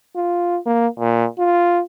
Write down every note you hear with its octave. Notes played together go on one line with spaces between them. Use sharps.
F4
A#3
A#2
F4